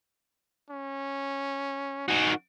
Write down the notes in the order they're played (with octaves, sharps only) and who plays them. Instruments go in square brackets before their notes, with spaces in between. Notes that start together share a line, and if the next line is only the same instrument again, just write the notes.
[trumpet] C#4
[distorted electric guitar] D#3 F#4 [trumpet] G#5